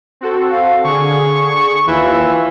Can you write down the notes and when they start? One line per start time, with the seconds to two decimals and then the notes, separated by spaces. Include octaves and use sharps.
0.21 C4 F#4 A4
0.50 F5
0.84 D3 G#4 C#6
1.87 D#2 E3 F4 E6